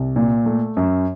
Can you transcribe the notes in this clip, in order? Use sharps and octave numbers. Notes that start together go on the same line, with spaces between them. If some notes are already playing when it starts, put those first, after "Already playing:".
Already playing: C2
A#2
A3
F#2